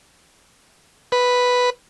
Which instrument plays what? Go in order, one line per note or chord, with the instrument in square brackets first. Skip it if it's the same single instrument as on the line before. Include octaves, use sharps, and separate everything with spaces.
[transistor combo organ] B4